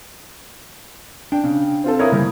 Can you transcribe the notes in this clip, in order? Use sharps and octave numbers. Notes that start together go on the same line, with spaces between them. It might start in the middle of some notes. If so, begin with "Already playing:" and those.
D4 G5
C#3
C4 F4 A4
E4 A#4 C#5 F5 A#5 D#6
C#3 G3 A#3